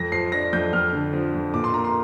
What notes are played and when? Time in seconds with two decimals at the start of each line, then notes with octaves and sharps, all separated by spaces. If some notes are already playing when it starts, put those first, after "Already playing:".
Already playing: F2 A#6
0.12 F3 C7
0.32 D4 A#6
0.53 F2 G6
0.73 F2 F6
0.93 D3
1.13 F3
1.34 F2
1.54 A#2 D6
1.64 C6
1.74 A#3 A#5
1.84 C6